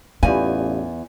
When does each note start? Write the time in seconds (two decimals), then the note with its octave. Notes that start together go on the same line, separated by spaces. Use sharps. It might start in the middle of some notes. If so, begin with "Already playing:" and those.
0.23 A1 E2 F4 G4 D5 F5 G#5